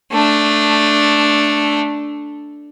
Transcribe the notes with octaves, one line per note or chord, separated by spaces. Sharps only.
A3 D4